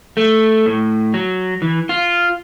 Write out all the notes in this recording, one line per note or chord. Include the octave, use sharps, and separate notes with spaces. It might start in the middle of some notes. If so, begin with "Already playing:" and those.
A3
A2
F#3
E3
F4